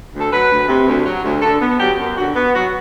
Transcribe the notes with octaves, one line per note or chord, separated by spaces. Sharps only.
D2
A4
F#3 B4
D2
C3
D2
F#3
D2
D3 A4
B3
F#3 G4
F#2
D3 F#4
B3
F#3 F#4